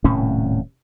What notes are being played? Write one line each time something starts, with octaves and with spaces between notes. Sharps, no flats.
D#1 A2 C3 C#4